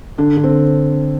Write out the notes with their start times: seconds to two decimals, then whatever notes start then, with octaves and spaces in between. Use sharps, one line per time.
0.18 D3 D4
0.37 D3
0.44 C4